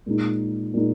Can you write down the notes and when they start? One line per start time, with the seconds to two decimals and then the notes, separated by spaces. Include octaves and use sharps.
0.06 A#2 G#3 D#4
0.74 A#2 G#3 D#4